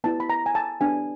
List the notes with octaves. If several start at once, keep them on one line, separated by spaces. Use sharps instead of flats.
B3 E4 G4 A5
B5
A#5
G#5
A5
B3 D4 G4 G#5